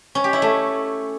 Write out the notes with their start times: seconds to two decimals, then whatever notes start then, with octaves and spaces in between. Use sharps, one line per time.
0.15 C#4
0.24 G4
0.33 E4
0.42 A3